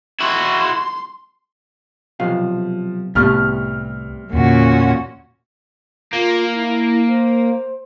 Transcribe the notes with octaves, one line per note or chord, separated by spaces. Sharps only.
E4 F#4 C6
B1 C3 F3 F5
C2 A2 C3 G3 A3 B3 F6
E2 A#2 D3 C#4 F#4
A#3 F4
E4
C5